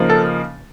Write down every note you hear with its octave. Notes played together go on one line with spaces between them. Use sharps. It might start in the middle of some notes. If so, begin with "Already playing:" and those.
Already playing: C#3 F3 A#3 D#4
A4